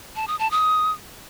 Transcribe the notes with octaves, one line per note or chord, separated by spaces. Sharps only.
A5
D#6
A5
D#6